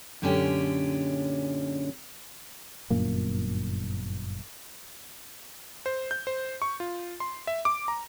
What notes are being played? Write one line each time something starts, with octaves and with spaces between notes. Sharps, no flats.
F#2 A#2 D3 G#3 C#4 G4
G1 F#2 A#2 A#3
C5
G6
C5
C#6
F4
C6
E5
D6
A#5